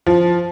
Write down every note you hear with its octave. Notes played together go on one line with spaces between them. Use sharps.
F3